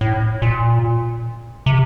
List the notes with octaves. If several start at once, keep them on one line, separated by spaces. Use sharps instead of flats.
A2
A#2
C3